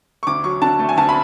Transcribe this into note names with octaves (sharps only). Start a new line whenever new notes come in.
C#6
D2 D6
F#3 C#6
D3 A5
A3
G#5
D2 A5
B5